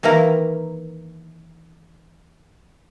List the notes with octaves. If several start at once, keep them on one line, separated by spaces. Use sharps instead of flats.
D#3 E3 A#3 E4 A#4